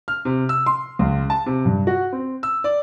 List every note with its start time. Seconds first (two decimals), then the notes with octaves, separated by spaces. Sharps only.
0.08 F6
0.25 C3
0.49 E6
0.66 C6
0.99 C#2
1.30 A5
1.46 C3
1.65 G2
1.87 F#4
2.13 C4
2.43 E6
2.64 D5